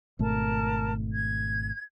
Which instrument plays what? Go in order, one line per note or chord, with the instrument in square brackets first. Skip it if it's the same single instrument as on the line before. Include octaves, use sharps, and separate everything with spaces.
[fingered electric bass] G#1 B2 A3 [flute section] A#4 A5
[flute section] G#6